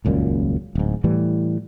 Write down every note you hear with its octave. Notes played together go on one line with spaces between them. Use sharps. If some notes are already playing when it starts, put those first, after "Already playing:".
D#1 C#2 F#2 A#2
D1 G#2
A2 E3 G3